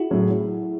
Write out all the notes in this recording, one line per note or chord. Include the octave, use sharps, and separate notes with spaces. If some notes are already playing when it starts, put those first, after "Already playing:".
Already playing: E4 F#4 G#4
A2 F#3